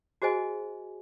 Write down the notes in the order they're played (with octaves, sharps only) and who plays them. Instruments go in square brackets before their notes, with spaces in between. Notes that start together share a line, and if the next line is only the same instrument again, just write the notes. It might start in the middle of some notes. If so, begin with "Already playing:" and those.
[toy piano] F#4 G#4 C5 D#5 G#5